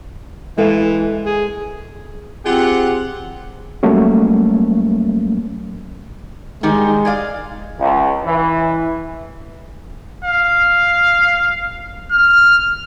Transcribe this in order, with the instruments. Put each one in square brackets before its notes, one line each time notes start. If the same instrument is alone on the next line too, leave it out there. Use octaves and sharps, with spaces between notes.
[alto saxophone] E3 [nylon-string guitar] G#3 A4 F5
[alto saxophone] G#4
[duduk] C4 [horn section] F4 G4 F#5 [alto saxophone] G#4
[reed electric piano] F#3 G3 A3 A#3 C#4
[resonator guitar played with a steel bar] D#3 G3 D#4 [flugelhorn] G#3
[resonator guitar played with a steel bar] G#4 D5 F5
[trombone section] C#2
E3
[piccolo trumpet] F5
F6